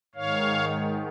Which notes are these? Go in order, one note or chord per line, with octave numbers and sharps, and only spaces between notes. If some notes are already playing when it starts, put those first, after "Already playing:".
G#2 D#3 C#5 F5